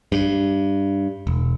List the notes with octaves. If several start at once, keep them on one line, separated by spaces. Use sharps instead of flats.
G2
E1